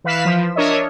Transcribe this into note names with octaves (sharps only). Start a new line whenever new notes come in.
E3 B4 F5 B6 E7
F3
D4 A#4 C#5 D#5 E5